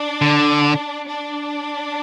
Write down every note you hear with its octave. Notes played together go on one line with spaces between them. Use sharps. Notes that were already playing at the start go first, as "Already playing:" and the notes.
Already playing: D4
D3
D4